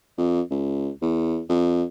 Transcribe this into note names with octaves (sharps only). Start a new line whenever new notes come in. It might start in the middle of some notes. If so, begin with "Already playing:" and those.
F2
C#2
E2
F2